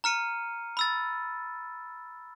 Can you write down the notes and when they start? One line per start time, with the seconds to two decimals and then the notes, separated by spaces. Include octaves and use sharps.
0.04 A#5 F6 C#7 D#7
0.77 B5 E6 A6